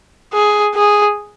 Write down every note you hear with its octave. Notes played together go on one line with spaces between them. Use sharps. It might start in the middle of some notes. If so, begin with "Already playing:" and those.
G#4
G#4